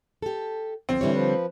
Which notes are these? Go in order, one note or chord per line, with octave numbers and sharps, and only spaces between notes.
G4 A4
D2 F3 C4
D3 E3 G3 E4 C#5
F3 B4